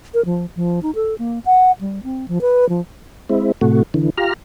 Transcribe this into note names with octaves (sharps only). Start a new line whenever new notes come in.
A#4
F3
F3
D#4
A4
A#3
F#5
G3
C4
F3
B4
F3
G#3 C4 E4
A2 C3 A3 F#4
D3 E3
F4 G4 A#5 F6